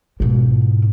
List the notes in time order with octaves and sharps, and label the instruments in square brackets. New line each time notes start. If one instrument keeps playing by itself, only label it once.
[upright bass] G#2 B2